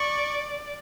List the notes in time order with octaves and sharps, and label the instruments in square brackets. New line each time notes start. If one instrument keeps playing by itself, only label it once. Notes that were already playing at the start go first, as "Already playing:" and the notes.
Already playing: [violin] D5 [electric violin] C#6